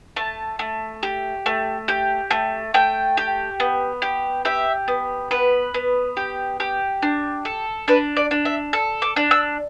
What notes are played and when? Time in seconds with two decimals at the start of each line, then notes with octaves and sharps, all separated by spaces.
0.16 A3 A5
0.59 A3
1.03 G4
1.46 A3
1.88 G4
2.31 A3
2.74 A3 G5
3.17 G4
3.60 B3
4.02 G4
4.45 G4 E5
4.88 B3
5.31 B3 B4
5.74 B3
6.17 G4
6.60 G4
7.02 D4
7.45 A4
7.88 D4 B4
8.17 D5
8.31 D4
8.45 E5
8.73 A4 E6
9.02 D6
9.16 D4
9.31 E6